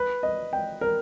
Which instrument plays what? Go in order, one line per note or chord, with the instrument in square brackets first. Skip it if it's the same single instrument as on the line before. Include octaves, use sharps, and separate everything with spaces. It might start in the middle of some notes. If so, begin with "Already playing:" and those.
Already playing: [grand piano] B4
D#5
G5
A#4